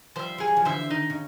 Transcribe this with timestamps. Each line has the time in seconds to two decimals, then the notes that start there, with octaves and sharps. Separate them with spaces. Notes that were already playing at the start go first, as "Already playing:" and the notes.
0.16 F3 G3 C5 E5
0.38 G3 G#4
0.48 F#3
0.56 F3
0.65 D3 E3 C5 E5
0.90 D#3 D#4
1.10 C#3